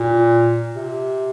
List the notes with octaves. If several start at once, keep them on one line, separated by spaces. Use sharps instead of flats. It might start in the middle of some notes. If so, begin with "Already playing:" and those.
Already playing: A#2
C3